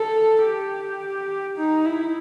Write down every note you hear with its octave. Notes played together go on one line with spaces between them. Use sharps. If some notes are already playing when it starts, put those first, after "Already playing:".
Already playing: A4
G4
D#4
E4